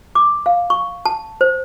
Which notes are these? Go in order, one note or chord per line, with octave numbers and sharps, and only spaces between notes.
D6
F5
C#6
A5
C5